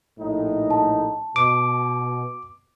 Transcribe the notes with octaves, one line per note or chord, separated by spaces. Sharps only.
A#1 A2 D#4
A5
B2 D6